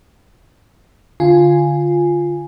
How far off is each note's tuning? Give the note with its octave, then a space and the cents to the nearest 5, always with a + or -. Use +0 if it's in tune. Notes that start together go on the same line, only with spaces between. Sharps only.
D3 +0 F4 +0 G#5 +0